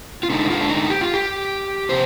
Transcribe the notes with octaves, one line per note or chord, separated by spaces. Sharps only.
F4
D3 G#3 D4 D#4
F4
D4
D#4
G4
F4
G4
C3 F3 B3 C5